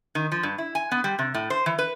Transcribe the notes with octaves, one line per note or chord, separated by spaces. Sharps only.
D#3
F3
G2
E4
G#5
B3
G3
C3
A2
C5
E3
B4